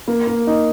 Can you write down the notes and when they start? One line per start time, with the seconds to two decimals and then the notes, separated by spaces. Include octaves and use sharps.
0.08 A#3
0.27 A#3
0.47 D#4